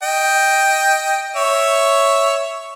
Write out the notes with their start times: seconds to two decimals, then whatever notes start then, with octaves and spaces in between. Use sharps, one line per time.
0.03 D#5 G5
1.36 C#5 E5